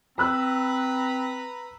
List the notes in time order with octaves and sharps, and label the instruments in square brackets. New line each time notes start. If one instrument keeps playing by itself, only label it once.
[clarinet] C4 [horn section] B4 A#5 [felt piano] B5 E6 F#6